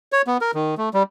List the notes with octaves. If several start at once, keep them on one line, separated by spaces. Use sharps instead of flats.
C#5
B3
A#4
D#3
A3
G3